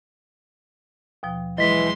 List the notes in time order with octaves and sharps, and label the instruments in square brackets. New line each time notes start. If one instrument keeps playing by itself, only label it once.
[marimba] D#2 B2 F3
[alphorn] E3 [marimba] F#3 [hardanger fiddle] G#3 C6 [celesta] D#5 B6